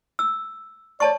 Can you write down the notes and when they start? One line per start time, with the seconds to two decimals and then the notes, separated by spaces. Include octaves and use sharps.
0.19 E6
1.00 C#5 D5 A5 C#6